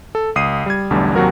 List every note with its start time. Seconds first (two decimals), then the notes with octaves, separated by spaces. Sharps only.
0.15 A4
0.36 C#2 D#6 C7 D#7
0.66 G3 G#6
0.90 B1 E2 D3 G3 A3
1.15 D#2 C3 F#3 F#4 A#4